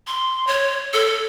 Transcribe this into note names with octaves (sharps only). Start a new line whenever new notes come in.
C6
C#5
A4